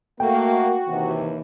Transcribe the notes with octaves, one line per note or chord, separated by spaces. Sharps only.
A3 A#3 F#4 G5
D#2 C3 E3